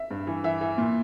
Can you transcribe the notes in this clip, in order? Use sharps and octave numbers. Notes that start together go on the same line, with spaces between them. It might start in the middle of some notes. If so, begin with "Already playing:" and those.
Already playing: E5
G2
E3
E3 E5
E3
A#2